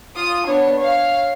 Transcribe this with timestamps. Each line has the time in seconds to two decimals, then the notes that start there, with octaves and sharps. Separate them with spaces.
0.16 F4 D#6
0.47 B3 D4 C#5
0.79 C#5 F5